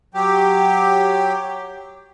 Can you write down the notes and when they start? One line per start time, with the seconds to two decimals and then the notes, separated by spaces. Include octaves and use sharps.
0.14 F#3 G4